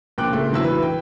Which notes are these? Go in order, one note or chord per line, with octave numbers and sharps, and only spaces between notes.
A#1 A#2 G5 D6 F#6
A#2 C#3 A3
A#1 G#2 E3 F#3 E5 E6
E3 B4
G5